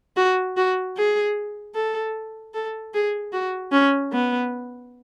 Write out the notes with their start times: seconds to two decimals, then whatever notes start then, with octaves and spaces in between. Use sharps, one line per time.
0.16 F#4
0.57 F#4
0.97 G#4
1.75 A4
2.54 A4
2.94 G#4
3.33 F#4
3.72 C#4
4.12 B3